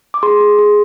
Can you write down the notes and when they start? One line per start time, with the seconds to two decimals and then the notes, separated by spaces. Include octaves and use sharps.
0.14 D6
0.23 G#4 C6
0.41 G#4
0.59 G#4